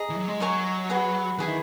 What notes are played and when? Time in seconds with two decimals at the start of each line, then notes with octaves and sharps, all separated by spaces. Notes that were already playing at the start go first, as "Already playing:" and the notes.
Already playing: G#4 D#5 A#5 D#6
0.09 E3
0.16 F#3
0.28 G#3
0.40 F#3 D#4 A#4 C#5 G#5
0.90 G#4 B4 F#5
1.38 E3 E4 G#4 B4
1.47 D#3